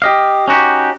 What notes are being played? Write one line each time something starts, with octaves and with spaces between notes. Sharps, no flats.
G4 D#5 F5
C#4 D#4 F#4 G4